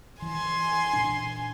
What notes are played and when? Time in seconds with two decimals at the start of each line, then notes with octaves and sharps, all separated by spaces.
0.22 E3 G#5 C6
0.93 A#2 D4